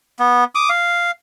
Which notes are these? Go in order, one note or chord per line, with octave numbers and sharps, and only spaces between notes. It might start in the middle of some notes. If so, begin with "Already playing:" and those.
B3
D6 D#6
F5